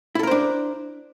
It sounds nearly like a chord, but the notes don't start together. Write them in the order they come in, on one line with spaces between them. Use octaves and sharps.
E4 A4 A#4 C5 D4